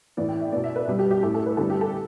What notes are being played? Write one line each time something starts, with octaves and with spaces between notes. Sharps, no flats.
A2 E3 B3 D5
G5
E5
B2 B3 D5
E5
B4
B2 G3 B3
G4
G4
A2 A3 A4
A4
B4
D3 G3 B3 A4
G4
A4